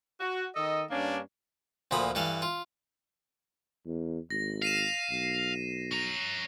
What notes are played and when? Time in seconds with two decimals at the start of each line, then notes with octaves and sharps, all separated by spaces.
0.20 F#4
0.55 D#3 A4 D#5
0.91 G2 A#3 C#4 D4
1.91 D2 A#2 F3 B5 D#6
2.15 G2 E3 A4 F5
2.42 F4
3.86 E2
4.30 G#1 A#6
4.62 F5 C7 D#7 E7
5.11 B1
5.91 C#4 A#5 A#6